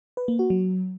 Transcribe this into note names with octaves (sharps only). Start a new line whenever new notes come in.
B4
A#3
F#4
F#3